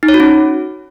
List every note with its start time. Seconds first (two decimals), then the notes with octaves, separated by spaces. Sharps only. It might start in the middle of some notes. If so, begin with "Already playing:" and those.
0.03 D#4
0.08 C#5
0.14 F#4
0.20 C#4